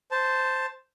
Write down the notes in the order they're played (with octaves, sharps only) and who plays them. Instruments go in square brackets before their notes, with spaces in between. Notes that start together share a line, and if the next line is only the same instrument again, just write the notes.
[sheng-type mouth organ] C5 A5